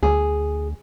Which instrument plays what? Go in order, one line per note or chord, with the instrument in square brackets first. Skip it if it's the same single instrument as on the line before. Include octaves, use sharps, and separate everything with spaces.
[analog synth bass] D2 [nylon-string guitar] G#4